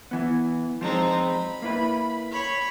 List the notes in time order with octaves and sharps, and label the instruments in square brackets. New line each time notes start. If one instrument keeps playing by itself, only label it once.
[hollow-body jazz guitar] E3 B3
[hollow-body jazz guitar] F3 G#3 [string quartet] C4 D#4 C5
[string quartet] B5
[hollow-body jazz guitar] A#3 E4 B4
[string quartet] C#5 B5 C#6